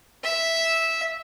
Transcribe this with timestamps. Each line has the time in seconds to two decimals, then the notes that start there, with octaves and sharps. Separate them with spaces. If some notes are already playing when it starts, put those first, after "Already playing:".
0.23 E5